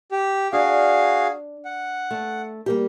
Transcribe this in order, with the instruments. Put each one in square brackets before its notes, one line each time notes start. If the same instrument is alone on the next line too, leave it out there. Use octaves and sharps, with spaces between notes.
[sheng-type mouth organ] G4
[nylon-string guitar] D4 [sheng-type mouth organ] F#4 G#4 F5
[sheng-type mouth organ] F#5
[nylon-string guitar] A3
G3 A#3 G4